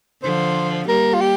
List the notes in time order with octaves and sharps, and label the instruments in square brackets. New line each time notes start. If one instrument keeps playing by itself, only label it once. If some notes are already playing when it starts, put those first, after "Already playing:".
[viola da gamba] D3 F3 [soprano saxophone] C5
[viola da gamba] G3 A#3 [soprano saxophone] A#4
[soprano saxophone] F4
G4